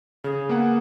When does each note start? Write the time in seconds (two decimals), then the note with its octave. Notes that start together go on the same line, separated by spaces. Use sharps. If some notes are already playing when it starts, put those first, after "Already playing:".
0.24 C#3 G#4
0.49 A#3 B3 F#5